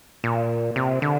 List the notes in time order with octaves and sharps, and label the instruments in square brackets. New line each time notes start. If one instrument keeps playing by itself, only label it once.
[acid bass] A#2
C3
D3